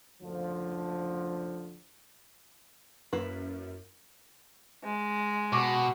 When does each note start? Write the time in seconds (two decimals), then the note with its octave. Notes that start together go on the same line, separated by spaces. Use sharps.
0.22 F#1 D2 D3 F3
3.13 F#2 A#3 E4 B4
4.84 G#3
5.53 B2 C#6 D6